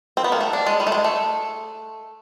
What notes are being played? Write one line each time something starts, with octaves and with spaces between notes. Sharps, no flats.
C4
B3
A#3
A3
D4
G#3
G3
A3
G#3
A3